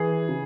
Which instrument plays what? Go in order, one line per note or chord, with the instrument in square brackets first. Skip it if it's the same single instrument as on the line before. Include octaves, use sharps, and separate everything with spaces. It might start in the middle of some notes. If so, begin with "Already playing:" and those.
Already playing: [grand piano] E3 [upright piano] G#4
[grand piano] C#3